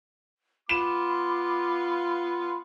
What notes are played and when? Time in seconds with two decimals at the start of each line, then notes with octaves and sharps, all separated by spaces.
0.69 B3 F4 B5 D6 E7